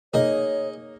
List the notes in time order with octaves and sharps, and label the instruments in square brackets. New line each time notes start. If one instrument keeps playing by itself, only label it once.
[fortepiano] A#3 D#4 [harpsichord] G#4 D#5 [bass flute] C#5